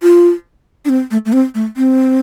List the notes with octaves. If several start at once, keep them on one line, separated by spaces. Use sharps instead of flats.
F4
D4
C4
A3
A3
C4
A3
C4